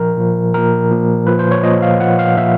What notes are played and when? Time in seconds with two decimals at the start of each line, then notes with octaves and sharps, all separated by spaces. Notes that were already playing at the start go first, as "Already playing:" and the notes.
Already playing: A#2 F3 A#4
0.17 A#2 F3
0.54 A#2 F3 A#4
0.91 A#2 F3
1.27 A#2 F3 B4
1.39 C5
1.51 C#5
1.63 A#2 F3 D#5
1.82 F5
2.00 A#2 F3 F#5
2.19 F5
2.37 A#2 F3 E5